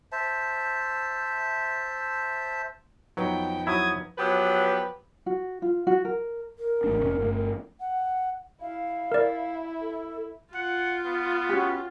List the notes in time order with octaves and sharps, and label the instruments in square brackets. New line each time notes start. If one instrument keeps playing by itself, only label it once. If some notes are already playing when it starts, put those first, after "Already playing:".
[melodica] C5 E5 A5
[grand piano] F2 B3 D#4 [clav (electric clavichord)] F#3 [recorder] G5
[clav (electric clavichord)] F#3 E4 [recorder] D#6 [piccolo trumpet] G#6
[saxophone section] F3 F#3 B3 G4 B4
[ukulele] F#4
F4
F#4
A#4
[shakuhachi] A#4
[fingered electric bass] A1 A3 D4
F1 A#2 C#4
G1 B2 A3
[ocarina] F#5
[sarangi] E4 [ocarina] F5
[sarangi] E4 [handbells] A#4 D5
[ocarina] A4
[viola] F4 [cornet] F#5
[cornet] B3
[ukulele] C#4 F#4 G4